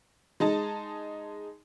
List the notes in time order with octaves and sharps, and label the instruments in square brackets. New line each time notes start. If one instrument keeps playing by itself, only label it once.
[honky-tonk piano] G#3 D#4 A5